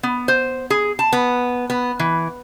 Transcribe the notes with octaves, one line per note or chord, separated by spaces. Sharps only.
B3
C5
G#4
A5
B3
B3
E3